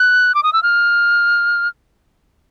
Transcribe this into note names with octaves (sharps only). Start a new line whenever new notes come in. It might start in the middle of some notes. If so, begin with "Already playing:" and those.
Already playing: F#6
D6
D#6
E6
F6